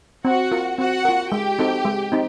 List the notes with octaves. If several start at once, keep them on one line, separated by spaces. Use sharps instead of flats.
C4 F#4 F#5
F4 A#4
C4 F#4 F#5
F4 A#4
G#3 G4 G5
C4 D#4 F#4 A4
G#3
C4 D#4